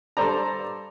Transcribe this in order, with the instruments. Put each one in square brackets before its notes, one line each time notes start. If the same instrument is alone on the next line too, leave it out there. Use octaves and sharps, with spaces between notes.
[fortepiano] G2 A4 C5 D5 A#5